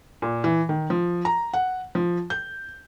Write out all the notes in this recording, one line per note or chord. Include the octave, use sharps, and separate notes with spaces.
A#2
E3
D#3
F3
A#5
F#5
F3
G6